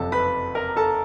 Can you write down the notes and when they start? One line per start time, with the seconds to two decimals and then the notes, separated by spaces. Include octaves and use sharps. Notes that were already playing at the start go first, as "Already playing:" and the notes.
Already playing: F#1 F2 C3 A4 A5
0.12 B4 B5
0.55 A#4 A#5
0.77 A4 A5